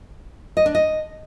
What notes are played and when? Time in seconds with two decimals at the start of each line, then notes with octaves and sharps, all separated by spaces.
0.57 D#5
0.66 D4
0.75 D#5